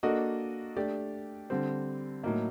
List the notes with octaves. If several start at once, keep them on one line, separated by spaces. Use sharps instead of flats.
A#3 D4 F#4 A4 D#5
A3 D4 G4 D5
D3 G3 C4
A2 F#3 A#3 D#4